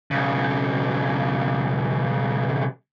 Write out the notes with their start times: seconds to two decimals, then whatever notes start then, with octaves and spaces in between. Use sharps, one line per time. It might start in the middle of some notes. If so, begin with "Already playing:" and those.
0.11 B1 C#3